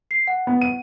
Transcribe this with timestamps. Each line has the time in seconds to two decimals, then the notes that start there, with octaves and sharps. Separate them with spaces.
0.11 C7
0.28 F#5
0.47 B3
0.62 D#7